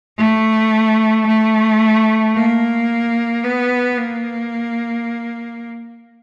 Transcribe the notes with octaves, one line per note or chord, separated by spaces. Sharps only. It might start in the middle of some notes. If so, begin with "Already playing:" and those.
A3
A3
A#3
B3
A#3